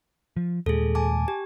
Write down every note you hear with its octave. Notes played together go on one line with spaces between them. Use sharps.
F3
D#2 A#2 G#3 G#4 A4
G#5 A5 D6
G4